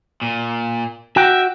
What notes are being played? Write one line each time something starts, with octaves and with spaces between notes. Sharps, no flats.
A#2
F#4 E5 G5